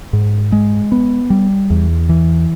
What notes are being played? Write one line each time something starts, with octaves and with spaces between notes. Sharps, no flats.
G#2
G#3
B3
G3
E2
E3